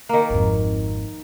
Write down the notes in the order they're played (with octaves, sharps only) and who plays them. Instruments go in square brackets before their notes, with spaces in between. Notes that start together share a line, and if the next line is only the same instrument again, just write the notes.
[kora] D#3 A#3
[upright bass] G#1 F2